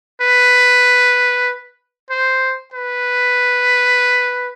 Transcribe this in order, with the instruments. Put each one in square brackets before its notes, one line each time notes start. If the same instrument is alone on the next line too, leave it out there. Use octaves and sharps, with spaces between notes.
[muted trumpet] B4
C5
B4